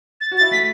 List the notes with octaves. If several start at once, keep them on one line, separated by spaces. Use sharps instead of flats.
A6
F#4
A6
E4
A3 B6